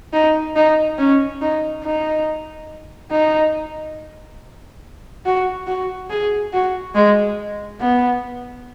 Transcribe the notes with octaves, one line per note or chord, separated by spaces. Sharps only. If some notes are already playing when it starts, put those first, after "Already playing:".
D#4
D#4
C#4
D#4
D#4
D#4
F#4
F#4
G#4
F#4
G#3
B3